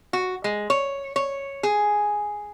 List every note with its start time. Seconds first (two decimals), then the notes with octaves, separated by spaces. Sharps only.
0.13 F#4
0.44 G#3
0.70 C#5
1.16 C#5
1.63 G#4